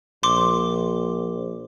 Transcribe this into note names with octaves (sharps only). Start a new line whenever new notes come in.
A#1 C6 D6